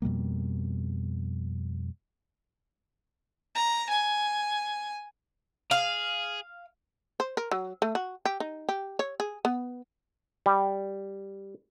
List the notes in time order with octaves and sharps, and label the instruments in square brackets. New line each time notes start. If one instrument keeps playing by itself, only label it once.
[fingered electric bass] F2 B2 G3 A#3
[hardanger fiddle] A#5
G#5
[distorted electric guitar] G#4 [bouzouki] F5
[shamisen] C5
A#4
F#3
A3
F#4
G4
D#4
G4
C#5
G#4
B3
[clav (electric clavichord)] G3